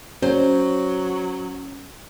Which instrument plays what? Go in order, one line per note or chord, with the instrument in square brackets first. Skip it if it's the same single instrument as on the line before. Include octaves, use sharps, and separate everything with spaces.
[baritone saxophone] F#3 [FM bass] C#4 [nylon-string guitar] C5